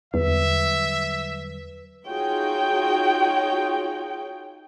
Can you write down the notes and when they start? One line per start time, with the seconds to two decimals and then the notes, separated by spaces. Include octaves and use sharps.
0.14 E2 D3 F#3 G3 B4 E5
2.07 D#4 F4 F#4 G#4 C#5 G5